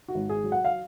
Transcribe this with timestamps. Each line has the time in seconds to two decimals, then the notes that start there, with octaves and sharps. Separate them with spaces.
0.08 F#4
0.15 G#1
0.29 G#4
0.44 F#3
0.52 F#5
0.65 F5